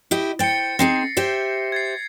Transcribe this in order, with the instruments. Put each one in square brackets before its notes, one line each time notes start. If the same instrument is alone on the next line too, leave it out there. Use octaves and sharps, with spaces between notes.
[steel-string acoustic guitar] E4 G4 D#5
[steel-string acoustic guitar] C5 G5 [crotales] A6 C#7
[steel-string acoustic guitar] C4 D#4 G#4 [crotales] A#6 C7 C#7
[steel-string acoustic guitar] G4 C5 E5
[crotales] G#6 A6 C7